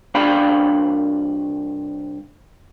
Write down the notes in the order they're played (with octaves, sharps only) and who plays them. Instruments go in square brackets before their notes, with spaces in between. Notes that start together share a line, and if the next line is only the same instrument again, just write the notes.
[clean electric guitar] C2 D4 D5 F5 G5 B5